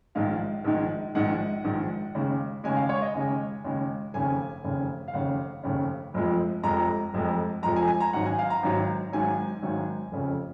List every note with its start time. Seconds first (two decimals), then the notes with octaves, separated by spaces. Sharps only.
0.15 A#1 G#2 D#3 G#3 F5
0.64 A#1 G#2 D#3 G#3
1.15 A#1 G#2 D#3 G#3 F#5
1.64 A#1 G#2 D#3 G#3
2.15 D#2 C#3 G#3
2.64 D#2 C#3 G#3 G#5
2.76 F5
2.89 C#5
3.02 D#5
3.14 D#2 C#3 G#3 G#5
3.64 D#2 C#3 G#3
4.14 F1 D#2 C#3 G#5
4.64 F1 D#2 C#3
5.08 F5
5.13 F1 D#2 C#3 F#5
5.63 F1 D#2 C#3
6.14 F1 F2 F3 G#3
6.63 F1 F2 F3 G#3 A#5
7.14 F1 F2 F3 G#3
7.63 F1 F2 F3 G#3 A#5
7.76 G#5
7.88 G#5
8.00 A#5
8.13 G#1 G#2 D#3 F#3 F#5
8.26 G#5
8.39 F5
8.50 A#5
8.63 G#1 G#2 D#3 F#3
9.12 G#1 G#2 D#3 F#3 G#5
9.62 G#1 G#2 D#3 F#3
10.12 F1 F2 C#3